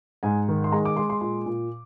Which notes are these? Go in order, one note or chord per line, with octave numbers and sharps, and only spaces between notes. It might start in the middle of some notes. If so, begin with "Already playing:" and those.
G#2 G#5
D#3
C6
G#3 A#5
D6
G#3 C6
C6
A#2 C6
A#2